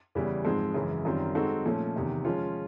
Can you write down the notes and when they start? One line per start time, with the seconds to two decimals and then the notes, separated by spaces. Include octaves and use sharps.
0.15 E2 C#3 E3 G3
0.45 G#2 F3 G#3 C4
0.74 F#2 C#3 E3 G#3
1.05 F#2 D#3 G3 C4 F4
1.35 G#3 C4 D#4 F#4 A4
1.65 A#2 F3 A3 C#4
1.96 E2 C3 D#3
2.25 F3 G#3 C#4 F4